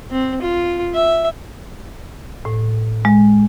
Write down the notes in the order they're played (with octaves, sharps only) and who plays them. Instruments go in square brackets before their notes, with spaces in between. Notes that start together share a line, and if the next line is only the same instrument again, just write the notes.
[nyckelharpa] C4
F4
E5
[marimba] A2
G#3